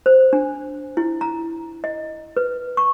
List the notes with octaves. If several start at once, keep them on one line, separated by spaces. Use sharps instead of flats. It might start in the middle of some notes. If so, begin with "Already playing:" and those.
C5
D4
E4
A#5
D#5
B4
C#6